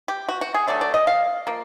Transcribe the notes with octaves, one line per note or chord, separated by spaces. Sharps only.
G4
F#4
F#4
G#4
D3 F#3 A3 D5
D5
D#5
F5
F3 A#3